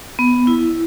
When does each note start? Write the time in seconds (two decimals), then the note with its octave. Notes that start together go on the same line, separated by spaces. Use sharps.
0.19 B3
0.47 E4